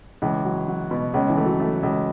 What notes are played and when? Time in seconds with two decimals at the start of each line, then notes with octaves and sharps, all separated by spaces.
0.22 C#2 E3
0.45 F#3
0.68 F#3
0.91 B2
1.14 C#2 C#4
1.29 E3
1.37 A3
1.45 F#3
1.60 A3
1.83 C#2